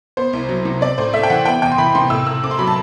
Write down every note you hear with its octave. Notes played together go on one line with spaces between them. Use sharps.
B3 C5
C2
F#3
C3
C4 D5
A2 C5
A3 E5
G5
E3 F#5
B3 G5
E2 G5
C6
E3 B5
C3 C6
A2 E6
A2 E6
C4 D6
C6
F#3 B5
A5